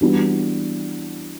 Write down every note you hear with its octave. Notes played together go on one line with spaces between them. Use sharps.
E3 G3 B3 D4 F#4